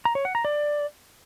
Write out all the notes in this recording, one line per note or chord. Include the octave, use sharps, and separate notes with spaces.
A#5
C#5
F#5
A#5
D5